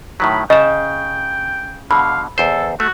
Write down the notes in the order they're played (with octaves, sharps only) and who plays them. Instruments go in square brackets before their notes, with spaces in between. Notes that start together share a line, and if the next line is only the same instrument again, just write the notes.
[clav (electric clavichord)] A2 D#3 F#3 [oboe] B5
[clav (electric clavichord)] C#3 [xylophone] D#5 E7 [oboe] G5
[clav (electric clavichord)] B2 D3 [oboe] F5 [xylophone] B5
[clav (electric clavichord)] E2 C5 [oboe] A4
[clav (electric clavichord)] A3 [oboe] F#4